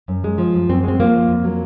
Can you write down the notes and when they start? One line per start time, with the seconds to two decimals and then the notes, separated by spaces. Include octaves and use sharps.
0.08 F#2
0.24 G#3
0.38 F3
0.54 F#2
0.69 F#2 C4
0.83 G#3 C4
1.00 F3 A#3
1.14 F#2
1.29 F2
1.44 F#3